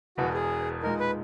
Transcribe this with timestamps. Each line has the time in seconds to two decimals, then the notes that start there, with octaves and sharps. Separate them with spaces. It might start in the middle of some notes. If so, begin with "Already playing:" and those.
0.18 E1 E2 B2 F#4
0.34 G#4
0.83 A#2 G#3 D#4 A#4
1.00 B4